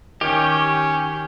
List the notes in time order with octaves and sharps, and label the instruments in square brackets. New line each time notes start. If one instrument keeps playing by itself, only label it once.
[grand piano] D#3 [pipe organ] C#4 [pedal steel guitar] G4